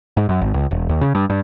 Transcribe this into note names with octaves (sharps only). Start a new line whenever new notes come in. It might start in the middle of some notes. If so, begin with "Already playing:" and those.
G#2
F#2
G#1
C#2
E1
D#2
C#3
G2
G2